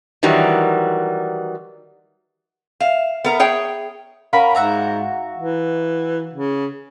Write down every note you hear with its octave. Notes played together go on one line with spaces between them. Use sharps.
D#3 E3 F#3 G3
E5 F5
B3 A#4
G#4 C#5 G5
C#4 A#4 F5 F#5 B5
G#2 F#4 E5 A#5
E3
C#3